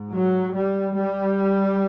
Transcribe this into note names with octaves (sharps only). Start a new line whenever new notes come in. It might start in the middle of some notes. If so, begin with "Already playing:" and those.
Already playing: G#2
F#3
G3
G3